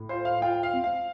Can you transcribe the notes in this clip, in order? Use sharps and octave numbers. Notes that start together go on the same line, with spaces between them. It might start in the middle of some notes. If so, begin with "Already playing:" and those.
Already playing: A2
F4 C5
F5
F4 G5
F5
C4
F5